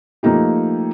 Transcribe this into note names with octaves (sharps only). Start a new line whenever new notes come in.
F3 A3 A#3 D#4 G4